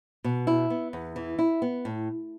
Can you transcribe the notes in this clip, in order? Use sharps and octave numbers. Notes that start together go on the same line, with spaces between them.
B2
E4
B3
E2
E3
E4
B3
A2